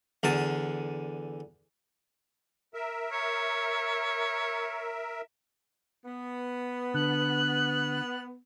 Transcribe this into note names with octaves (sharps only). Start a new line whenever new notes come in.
E2 D3 A5
A#4 E5
C#5
B3
D3 F#6